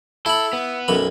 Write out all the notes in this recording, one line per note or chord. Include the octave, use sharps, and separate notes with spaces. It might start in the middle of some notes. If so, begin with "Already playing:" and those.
E4 A4 B5
B3
B1 F#2 B5